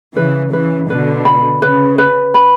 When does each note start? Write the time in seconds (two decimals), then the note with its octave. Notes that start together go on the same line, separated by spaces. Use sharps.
0.16 C#3 E3 B4
0.53 C#3 E3 B4
0.90 B2 D3 B4
1.25 B5
1.62 C#3 B4
1.98 B4
2.34 B5